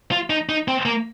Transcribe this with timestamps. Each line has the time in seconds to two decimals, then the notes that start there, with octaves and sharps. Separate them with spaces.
0.11 F4
0.30 D#4
0.49 D#4
0.68 C4
0.86 A#3